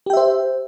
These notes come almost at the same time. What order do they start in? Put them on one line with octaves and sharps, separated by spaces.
G4 G5 E5 C5